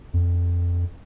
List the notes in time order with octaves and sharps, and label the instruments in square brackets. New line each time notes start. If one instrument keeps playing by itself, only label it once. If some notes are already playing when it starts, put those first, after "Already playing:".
[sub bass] F2